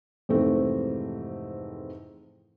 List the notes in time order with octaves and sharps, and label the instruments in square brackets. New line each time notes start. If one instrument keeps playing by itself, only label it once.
[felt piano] F2 G#2 C3 E3 A3 C4